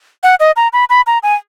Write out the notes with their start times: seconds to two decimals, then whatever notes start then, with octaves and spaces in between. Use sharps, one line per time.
0.23 F#5
0.40 D#5
0.56 A#5
0.73 B5
0.90 B5
1.07 A#5
1.23 G#5